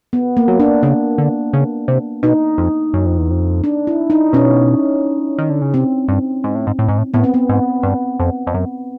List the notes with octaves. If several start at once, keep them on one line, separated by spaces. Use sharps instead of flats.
B3
A#3
F#3
D4
C#3 D4
D3
C#3
C3
B2 D#4
F2
F#2
F2
E2
F2
D4
E4
D#4
B2 C#4
D#3
D3
C#3
C3 C4
G2
G#2
A2
G#2
A2
G#2
A2
A2 B3
C4
B3
G#2
G2
F2
F2
F#2